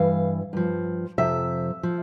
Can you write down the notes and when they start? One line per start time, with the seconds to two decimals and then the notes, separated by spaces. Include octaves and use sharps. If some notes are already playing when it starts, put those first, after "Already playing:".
Already playing: G2 E3 F5
0.53 G2 F3
1.18 F2 C3 F3 E5
1.83 F3